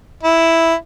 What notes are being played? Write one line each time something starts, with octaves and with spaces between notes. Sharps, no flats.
E4